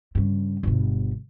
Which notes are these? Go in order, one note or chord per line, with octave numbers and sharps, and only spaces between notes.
G2 C#3
G1 B2